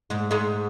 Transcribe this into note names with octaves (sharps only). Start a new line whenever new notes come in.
G#2 G#3
G#2 G#3